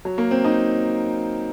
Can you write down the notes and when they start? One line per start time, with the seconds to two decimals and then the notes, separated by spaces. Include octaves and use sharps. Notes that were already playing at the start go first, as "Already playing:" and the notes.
0.05 F#3
0.18 A#3
0.31 C4
0.44 D#4